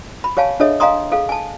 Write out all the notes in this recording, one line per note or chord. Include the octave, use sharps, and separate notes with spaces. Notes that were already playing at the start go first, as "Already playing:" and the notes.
B5
G4 C#5 F5 G#5 A5
D4 G#4 A4 C#5 D#5 E5
D#5 F5 G#5 A#5 C6 D#6
G#4 A4 F5
G#5 A5